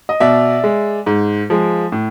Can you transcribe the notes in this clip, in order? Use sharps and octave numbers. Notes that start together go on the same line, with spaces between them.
D#5
B2 D5 E5
G#3
G#2
F3 G#3
A2